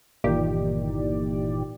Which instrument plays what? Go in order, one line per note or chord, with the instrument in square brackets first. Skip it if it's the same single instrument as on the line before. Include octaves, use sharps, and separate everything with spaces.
[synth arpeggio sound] G1 A#2 D#3 E3 G4 D5